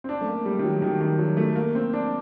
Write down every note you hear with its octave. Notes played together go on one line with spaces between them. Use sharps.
C4
D4
A3
A#3
G3
D#3
F#3
D#3
D#3
F#3
A3
A#3
C4
D4